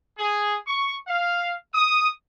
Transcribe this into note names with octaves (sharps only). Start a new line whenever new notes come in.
G#4
C#6
F5
D#6